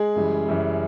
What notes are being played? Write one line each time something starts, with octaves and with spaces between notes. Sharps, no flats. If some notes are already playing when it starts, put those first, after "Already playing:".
Already playing: G#3 G#4
F#2 C#3 E3 G3
F#2 C#3 E3 G3